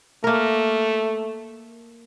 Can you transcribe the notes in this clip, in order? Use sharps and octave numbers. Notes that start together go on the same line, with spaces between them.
A3 A#3 A#4